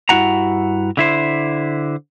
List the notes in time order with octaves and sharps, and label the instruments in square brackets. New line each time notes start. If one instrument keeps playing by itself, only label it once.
[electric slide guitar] G2 E4 F#4 F#5 A#5
D3 E4 C5